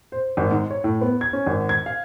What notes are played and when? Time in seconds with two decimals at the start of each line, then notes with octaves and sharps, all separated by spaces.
0.12 C5
0.37 G#1
0.51 G#2
0.71 C#5
0.84 A2
1.01 B3
1.21 G#6
1.33 C#4
1.46 G#1
1.69 G#6
1.86 F5